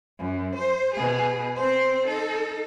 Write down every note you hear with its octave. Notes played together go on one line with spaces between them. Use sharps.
F#2
C5
B2 G#4
C4 C5
D#4 A4